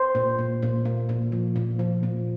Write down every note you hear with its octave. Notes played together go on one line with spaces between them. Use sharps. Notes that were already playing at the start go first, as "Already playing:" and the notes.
Already playing: C5
A#2
A#2
A#2
A#3
A#2
F3
A#2
F3
A#2